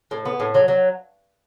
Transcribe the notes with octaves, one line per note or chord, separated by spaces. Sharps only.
A2
B3
A2
F#3
F#3